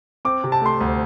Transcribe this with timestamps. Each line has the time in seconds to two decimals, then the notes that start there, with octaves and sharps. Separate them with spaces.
0.25 C4 D6
0.44 C3
0.52 A5
0.62 A3 C6
0.81 D2